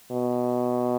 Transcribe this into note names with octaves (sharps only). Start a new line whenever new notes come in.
B2